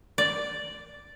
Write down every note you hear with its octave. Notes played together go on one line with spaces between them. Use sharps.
D5